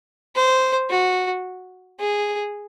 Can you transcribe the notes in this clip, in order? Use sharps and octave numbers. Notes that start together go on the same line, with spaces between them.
C5
F#4
G#4